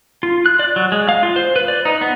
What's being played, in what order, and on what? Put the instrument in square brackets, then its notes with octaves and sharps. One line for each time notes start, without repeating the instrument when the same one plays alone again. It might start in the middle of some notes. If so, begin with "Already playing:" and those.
[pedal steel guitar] F4
F#6
D5
F#3
G#3
F5
F4
C5
B4
D5
D#4
B3